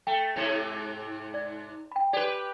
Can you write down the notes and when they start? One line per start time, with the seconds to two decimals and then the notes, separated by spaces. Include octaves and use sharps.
0.07 A3 G5
0.36 G#2 C3
1.34 D5
1.92 G5 B5
2.13 G4 B4 D5